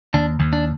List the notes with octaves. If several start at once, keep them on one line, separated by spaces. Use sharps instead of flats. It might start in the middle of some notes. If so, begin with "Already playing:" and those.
D#2 D4
D#2
D4